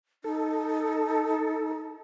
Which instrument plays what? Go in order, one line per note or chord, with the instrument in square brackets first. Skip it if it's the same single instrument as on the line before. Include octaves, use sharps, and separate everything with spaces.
[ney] D#4 [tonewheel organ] A4